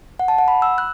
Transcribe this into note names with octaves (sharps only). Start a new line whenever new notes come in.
F#5
A5
F#5
B5
E6
F#6